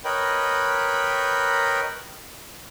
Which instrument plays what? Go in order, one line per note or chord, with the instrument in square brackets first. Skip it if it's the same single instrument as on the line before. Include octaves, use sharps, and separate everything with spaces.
[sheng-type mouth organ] A#4 B4 C#5 D#5 G5 B5